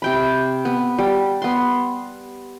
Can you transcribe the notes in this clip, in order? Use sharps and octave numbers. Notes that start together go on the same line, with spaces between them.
C3 G5 B5
B3
G3
B3 C6